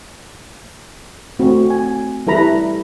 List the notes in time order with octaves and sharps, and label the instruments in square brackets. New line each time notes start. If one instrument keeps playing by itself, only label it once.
[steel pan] A3 C4 F#4
G#5
G3 E4 A4 B4 A#5 B5